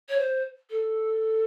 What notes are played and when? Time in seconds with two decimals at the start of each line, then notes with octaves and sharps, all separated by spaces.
0.09 C#5
0.19 C5
0.70 A4